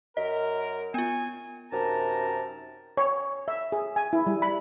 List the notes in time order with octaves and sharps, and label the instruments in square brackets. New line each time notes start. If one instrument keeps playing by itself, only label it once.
[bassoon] F#2 [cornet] A#4 [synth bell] D#5
[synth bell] B3 F4 [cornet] G#5
[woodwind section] F#2 C3 D#4 A#4 A5 A#5
[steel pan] C#5
E5
G#4
G#5
E4
G3
B5